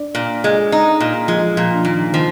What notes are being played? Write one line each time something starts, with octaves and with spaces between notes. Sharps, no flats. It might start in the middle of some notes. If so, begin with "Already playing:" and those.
Already playing: D4 D5
A#2
G#3
D#4
A#2
F3 G#3 F4
A#2 F3 F4
D4
A#2 D#3 D#4
D#3 F3 D#4